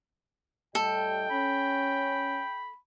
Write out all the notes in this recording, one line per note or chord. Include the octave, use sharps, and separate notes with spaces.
A2 G3 A4 D#5 G5
C#4 B5